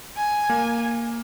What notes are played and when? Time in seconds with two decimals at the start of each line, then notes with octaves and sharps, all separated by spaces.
0.16 G#5
0.49 A#3